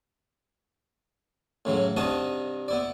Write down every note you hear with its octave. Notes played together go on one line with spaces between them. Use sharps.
A2 C#3 E3 F#3
G2 C3 D#4 F#4 A5 D#6
B3 E4 D5